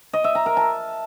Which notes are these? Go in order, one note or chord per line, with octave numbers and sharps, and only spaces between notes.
D#5
E5
A#5
A#4
A5